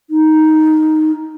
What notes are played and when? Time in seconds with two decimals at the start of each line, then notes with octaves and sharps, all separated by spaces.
0.10 D#4